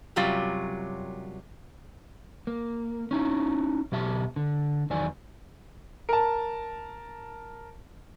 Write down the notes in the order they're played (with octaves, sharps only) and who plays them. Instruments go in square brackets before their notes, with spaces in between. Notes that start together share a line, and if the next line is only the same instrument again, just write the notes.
[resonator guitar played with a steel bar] F#2 C3 F#3 G3 F4
[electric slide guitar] A#3
C#4 D#4 E4
B2 F#3 G4 E5 A5
D3
E2 D#3 F#3 D5 G#5
[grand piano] A#4 A5